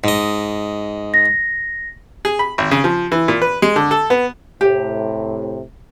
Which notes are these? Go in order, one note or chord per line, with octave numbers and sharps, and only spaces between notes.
G#2 D#5
A#6
G#4
B5
G#1
C#3
F3
E3
A#2
B4
G#3
D3
A4
B3
A2 C3 G4